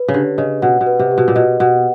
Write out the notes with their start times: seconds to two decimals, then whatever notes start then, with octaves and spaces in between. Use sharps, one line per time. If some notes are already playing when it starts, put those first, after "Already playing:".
Already playing: B4
0.08 C#3
0.14 D3 G4
0.37 C#3 D#5
0.62 B2 F#5
0.81 B2
0.87 B4
0.99 C3
1.11 G4
1.18 B2
1.28 A#2
1.35 B2 D#5
1.60 B2 F#5